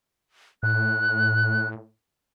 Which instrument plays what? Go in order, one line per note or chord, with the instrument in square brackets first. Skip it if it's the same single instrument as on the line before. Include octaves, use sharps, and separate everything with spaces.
[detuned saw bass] A2 [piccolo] F#6